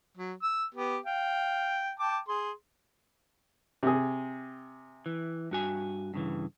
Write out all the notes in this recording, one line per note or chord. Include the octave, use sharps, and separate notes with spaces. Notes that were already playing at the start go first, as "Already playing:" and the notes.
F#3
E6
B3 G4
F5 G5
G5 A5 D6
G#4 C6
C3 G#4
E3
G2 F#4 G#5
G2 C#3 E3